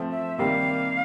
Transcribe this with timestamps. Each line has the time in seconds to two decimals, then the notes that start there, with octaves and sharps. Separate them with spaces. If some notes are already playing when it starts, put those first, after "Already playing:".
Already playing: F3 A3 C4
0.11 E5
0.38 C3 D#3 G3 A#3 F5